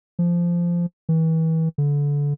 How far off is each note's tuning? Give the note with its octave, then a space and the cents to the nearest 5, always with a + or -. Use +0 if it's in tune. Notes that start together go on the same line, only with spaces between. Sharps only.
F3 -15
E3 -35
D3 -25